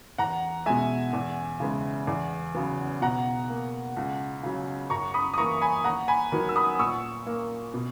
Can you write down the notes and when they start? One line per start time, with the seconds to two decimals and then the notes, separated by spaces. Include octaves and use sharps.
0.18 E2 F#5 A#5
0.66 B2 G#3 E5 G#5
1.13 E2
1.60 C#3 G#3 B3
2.07 E2
2.55 C#3 F#3 B3
3.02 B2 F#5 A#5
3.49 A#3
3.97 C#2
4.43 C#3 F#3
4.90 F#2 A#5 C#6
5.14 B5 D#6
5.34 D#6
5.38 E3 A#3 A#5 C#6
5.61 G#5 B5
5.84 D#2 F#5 A#5
6.08 G#5 B5
6.32 D#3 F#3 B3
6.49 E6
6.56 B5 D#6
6.79 A#2 C#6 E6
7.27 A#3
7.74 B2